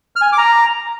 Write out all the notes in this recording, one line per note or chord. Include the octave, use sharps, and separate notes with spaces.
F6
G#5
F6
D6
A#5